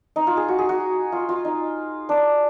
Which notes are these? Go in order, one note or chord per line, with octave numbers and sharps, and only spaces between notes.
D#4
F4
G#4
F#4
G#4
F#4
F4
F4
D#4
D4